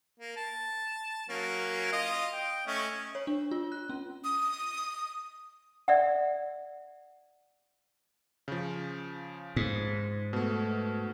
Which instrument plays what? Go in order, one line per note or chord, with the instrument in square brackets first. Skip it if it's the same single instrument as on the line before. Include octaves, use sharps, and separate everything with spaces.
[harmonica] A#3
A5
F#3 A#3 C#4
F4 D#5 F5
G5
A3 C#4 D#5
[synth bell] C#5
D4
F4
F#6
C#4
[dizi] D#6
[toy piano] D5 E5 F#5
[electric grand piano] C#3 F3
[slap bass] G#2
[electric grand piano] B2 A3